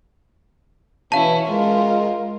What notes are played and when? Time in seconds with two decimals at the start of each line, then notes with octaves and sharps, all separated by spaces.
1.12 B2 E3 C#4 E4 F5 A5
1.49 G#3 F4 A#4